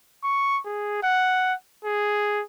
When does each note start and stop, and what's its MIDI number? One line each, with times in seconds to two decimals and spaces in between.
0.24 0.60 85
0.65 1.01 68
1.03 1.53 78
1.84 2.43 68